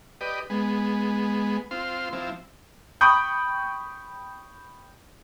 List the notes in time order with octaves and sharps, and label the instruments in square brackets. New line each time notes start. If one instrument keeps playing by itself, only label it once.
[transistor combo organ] G4 B4 D5 D#5
G#3 B3
C4 F4 C6
F3 C4 E4
[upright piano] G5 B5 C#6 D#6 G6